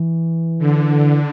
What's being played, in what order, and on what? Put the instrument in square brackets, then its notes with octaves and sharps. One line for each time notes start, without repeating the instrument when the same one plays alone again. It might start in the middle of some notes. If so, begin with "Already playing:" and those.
Already playing: [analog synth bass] E3
[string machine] D3